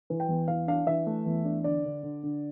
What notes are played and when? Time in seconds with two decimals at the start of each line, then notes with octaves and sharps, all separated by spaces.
0.10 E3
0.20 G5
0.28 E2
0.48 E3 F5
0.68 D4 F5
0.86 E3 E5
1.07 A3
1.26 E2
1.45 D4
1.64 D3 D5
1.85 D3
2.03 D3
2.23 D3